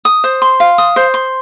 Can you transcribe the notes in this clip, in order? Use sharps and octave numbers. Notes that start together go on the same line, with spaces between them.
D#6
C5
C6
F5
D#6
C5
C6